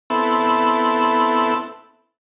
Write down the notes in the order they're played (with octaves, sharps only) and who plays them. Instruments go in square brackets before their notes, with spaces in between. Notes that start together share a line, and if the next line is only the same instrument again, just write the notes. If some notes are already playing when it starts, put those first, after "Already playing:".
[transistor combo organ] B3 C4 E4 A4